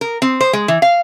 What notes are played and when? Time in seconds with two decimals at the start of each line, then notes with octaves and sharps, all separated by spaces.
0.01 A#4
0.22 C4
0.41 C5
0.53 G#3
0.68 E3
0.82 F5